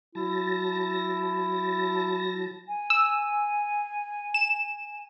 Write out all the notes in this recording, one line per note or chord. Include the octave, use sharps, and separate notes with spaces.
F#3 E4 A5 A#6
G#5
E6
E7